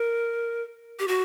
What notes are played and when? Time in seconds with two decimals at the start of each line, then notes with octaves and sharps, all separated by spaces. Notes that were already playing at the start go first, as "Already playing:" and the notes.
Already playing: A#4
0.99 G4
1.08 F#4